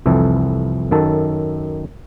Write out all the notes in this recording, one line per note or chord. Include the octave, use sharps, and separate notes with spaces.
C2 F2 E3 A4
F#2 D#3 A4 A5